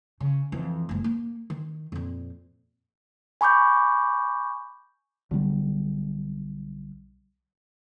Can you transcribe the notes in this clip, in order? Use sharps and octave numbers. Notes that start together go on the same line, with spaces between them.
C#3
F2 E3
F#1 G#2
A#3
D#3
F2 A#2
G#5 B5 C#6 D6 G6
B1 D3 F#3 G3